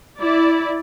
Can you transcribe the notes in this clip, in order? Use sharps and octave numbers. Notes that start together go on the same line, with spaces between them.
E4 D5